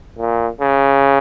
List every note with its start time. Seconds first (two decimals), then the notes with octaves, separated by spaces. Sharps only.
0.19 A#2
0.61 C#3